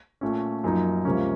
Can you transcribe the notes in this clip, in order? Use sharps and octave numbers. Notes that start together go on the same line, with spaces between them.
A#2 A3 C#4
F#2 F3 A#3 D#4
C#2 C3 F3 A#3 C#4